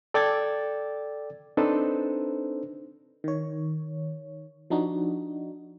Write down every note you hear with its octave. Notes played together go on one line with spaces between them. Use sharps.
A4 D5 G5 D6 G#6 A6
C4 D4 D#4 A4 B4 C5
D#3 C#5
F3 D4 D#4 F#4